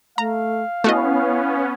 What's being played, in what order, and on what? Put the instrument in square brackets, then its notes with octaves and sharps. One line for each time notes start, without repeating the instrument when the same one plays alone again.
[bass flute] A3 [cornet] F5 [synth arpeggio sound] A#5
[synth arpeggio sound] A3 F#4 D#5 [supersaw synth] B3 C#4 [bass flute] E4